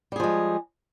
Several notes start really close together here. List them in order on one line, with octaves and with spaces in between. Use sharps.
G3 G#4 F3 G#3